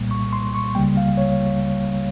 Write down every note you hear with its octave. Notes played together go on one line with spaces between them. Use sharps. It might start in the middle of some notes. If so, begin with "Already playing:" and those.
Already playing: C2 A#2 G3 A#3
C#6
C6
C#6
C#2 C#3 G3 A#3 G5
F5
C#5